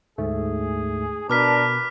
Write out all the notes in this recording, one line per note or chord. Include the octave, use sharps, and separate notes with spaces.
D2 G#2 A3 G#4
B2 D4 A#4 B4 A5 D6 F6 B6